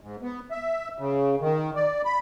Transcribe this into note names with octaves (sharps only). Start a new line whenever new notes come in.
G#2
B3
E5
C#3
D#3
D5
B5